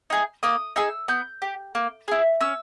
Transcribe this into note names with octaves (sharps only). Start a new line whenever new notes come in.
D#4 G#4
A#3 D#6
D#4 G#4 E6
B3 G6
G4
A#3
E4 G#4
C#4 E6